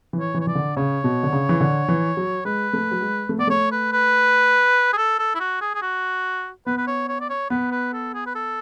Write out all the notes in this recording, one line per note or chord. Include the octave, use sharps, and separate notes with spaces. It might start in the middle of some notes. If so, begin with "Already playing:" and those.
E3
C#5
E3
C#5
E3 D5
D3
C#3 C#5
B2
D3
C#3
E3
D3
E3
F#3
G#3 B4
A3
F#3
G#3
A3
B3 D5
A3 C#5
B4
B4
G#4
A4
A4
E4
F#4
G#4
G#4
F#4
B3 B4
B4
C#5
C#5
D5
C#5
B3 B4
B4
A4
G#4
B4
A4